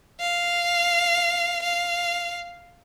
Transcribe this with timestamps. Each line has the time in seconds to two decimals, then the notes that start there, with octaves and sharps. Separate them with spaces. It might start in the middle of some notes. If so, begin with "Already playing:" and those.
0.20 F5
1.62 F5